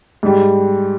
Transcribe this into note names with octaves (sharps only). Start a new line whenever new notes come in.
G#2 G3